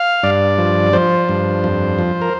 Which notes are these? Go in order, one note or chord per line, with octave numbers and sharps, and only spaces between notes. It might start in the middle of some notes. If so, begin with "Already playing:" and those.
Already playing: F5
G2 D5
F3
F3 C5
G2
F2
F3
A#4